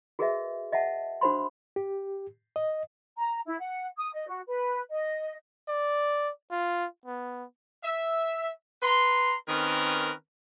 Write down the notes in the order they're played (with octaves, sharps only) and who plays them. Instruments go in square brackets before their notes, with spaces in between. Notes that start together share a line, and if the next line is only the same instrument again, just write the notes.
[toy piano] F#4 G#4 A#4 B4 D#5 E5
D#5 E5 F#5 A5
D4 F#4 A#4 C5 B5 C6
[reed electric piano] G4
D#5
[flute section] A#5
E4
F#5
D#6
D#5
F#4
B4
D#5
[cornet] D5
F4
B3
[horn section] E5
B4 A#5 C6
D#3 C4 C#4 A#4 B4